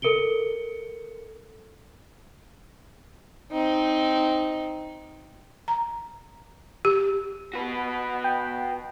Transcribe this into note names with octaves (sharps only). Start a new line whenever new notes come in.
A4 A#4 C#7 D7 G7
C4 D#4
A#5
G4
B3 F#4 B4
G5